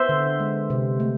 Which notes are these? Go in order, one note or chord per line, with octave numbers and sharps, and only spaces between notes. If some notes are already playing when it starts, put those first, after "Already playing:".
Already playing: B3 C5 E5
D3
G#3
C3
A3